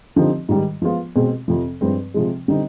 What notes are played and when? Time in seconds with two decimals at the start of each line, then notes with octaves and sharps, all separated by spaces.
0.16 D3 F3 C4 D#4 G4
0.49 G#2 D#3 G3
0.82 F3 G#3 B3 F4
1.16 B2 G#3 C4
1.48 F2 C3 F3
1.81 G2 F3 G#3 C4
2.14 C3 F3 G#3
2.48 D3 G3 C4 D#4